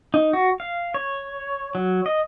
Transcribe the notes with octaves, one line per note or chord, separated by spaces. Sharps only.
D#4
F#4
F5
C#5
F#3
D#5